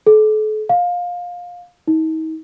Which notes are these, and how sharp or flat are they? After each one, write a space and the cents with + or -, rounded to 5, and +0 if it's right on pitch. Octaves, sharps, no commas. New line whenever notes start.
A4 -40
F5 +20
D#4 +40